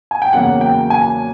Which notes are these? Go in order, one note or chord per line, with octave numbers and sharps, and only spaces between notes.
G#5
G5
E2 C#3 F#3 A#3 F#5
G5
G#5